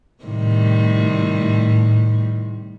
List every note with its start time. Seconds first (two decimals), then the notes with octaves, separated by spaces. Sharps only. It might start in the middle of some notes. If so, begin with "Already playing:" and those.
0.24 A2 C3 D#3 G3